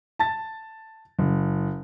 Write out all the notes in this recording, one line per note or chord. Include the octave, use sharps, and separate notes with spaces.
A5 A6
F#1